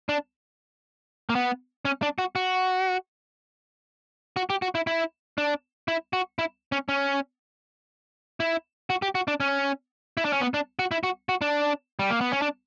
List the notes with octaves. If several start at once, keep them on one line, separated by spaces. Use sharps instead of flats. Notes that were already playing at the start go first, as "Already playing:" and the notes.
D4
A#3
B3
C#4
D4
F#4
F#4
F#4
G4
F#4
E4
E4
D4
E4
F#4
E4
C#4
C#4
E4
F#4
G4
F#4
D4
C#4
E4
D4
C#4
B3
D4
F#4
E4
F#4
F#4
D4
G3
A#3
B3
C#4
D4